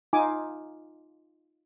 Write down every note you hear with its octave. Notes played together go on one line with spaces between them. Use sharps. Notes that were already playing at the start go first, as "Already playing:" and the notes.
D#4 F4 G#5 D6